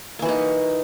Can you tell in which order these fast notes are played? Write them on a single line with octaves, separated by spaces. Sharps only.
A#3 E3 F#4 D#4